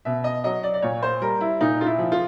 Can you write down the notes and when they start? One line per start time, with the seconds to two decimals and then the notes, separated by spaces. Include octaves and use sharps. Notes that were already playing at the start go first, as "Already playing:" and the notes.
0.05 B2 E5
0.24 D#5
0.44 F#3 D#5
0.63 D5
0.74 D5
0.82 A#2 C#5
1.03 C5
1.21 G3 A#4
1.41 E4
1.61 A#2 D#4
1.81 F4
1.86 E4
1.99 F3
2.12 F4